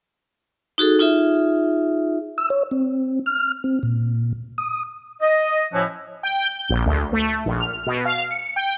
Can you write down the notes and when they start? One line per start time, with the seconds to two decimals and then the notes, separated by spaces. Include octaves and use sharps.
0.78 D#4 F#4 G#4 A4
0.99 D#4 F4 G#4 E5
2.38 E6
2.50 C#5
2.71 C4
3.26 F6
3.64 C4
3.83 A#2
4.58 D#6
5.22 D#5
5.73 A2 F3 C#4 E4 F#4 C#5
6.23 G5
6.43 G6
6.69 A#1
6.86 D2
7.13 A3
7.46 A#1
7.60 F6
7.87 B2
8.05 F5
8.31 C#7
8.56 G5